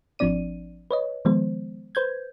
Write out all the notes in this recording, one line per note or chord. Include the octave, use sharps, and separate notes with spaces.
G#1 F3 C4 D4 D5 D#7
B4 C#5 D#5
D#3 F3 G#3 B3 C5
B4 C5 G6 G#6